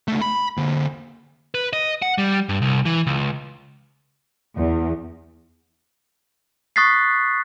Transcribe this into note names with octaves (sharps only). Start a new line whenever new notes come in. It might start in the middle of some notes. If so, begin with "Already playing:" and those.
C#2 A3
B5
D3 A#3
B4
D#5
F#5
G3
G2
C2
E3
C#2
E2
C#6 D#6 F#6 A6 B6 C7